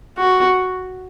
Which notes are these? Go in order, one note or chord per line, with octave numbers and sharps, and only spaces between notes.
F#4